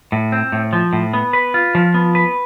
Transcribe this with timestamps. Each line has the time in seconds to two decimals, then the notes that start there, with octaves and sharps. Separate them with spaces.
0.12 A2
0.32 C4
0.52 A2
0.73 F3
0.93 A2
1.13 B3
1.33 B4
1.54 F4
1.75 F3
1.94 B3
2.15 B4